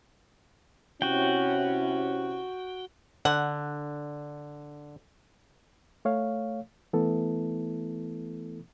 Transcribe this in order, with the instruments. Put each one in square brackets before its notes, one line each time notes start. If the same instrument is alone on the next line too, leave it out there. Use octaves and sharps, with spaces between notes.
[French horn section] C3 C#4 E4 [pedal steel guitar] F#4 G5
[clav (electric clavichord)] D3 [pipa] F#5
[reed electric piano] A3 C#5 F5
E3 A3 B3 E4 A4